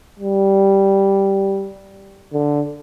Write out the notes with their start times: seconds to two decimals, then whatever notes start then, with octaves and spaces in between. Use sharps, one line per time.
0.20 G3
2.34 D3